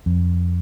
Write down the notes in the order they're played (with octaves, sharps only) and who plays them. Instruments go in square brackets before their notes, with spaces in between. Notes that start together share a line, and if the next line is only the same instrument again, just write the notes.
[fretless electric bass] F2